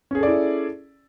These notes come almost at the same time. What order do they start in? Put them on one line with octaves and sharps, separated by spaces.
C#4 G#4 A4 D5 E4